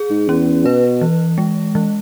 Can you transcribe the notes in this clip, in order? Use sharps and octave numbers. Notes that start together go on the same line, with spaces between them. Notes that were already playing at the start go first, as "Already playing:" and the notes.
Already playing: G#4
G#2
E2 C#4
B2 B4
E3
G#3
E3